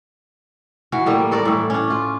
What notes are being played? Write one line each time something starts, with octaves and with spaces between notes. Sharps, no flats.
E3 F#4 F5
A2 G3 A#3
G2 A4 A#4 D5
A2 E3
C#4 D4
F4